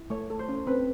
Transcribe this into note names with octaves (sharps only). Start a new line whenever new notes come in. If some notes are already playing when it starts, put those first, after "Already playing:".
Already playing: E4
A3 C#5
A4
C5
C#4
C4 B4